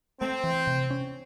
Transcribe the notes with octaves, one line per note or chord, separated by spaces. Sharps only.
A3 C4
E3
C3
C#4